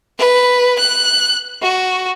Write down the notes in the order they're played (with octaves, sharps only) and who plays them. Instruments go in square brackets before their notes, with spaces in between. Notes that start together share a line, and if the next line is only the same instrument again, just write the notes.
[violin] B4
F#6
F#4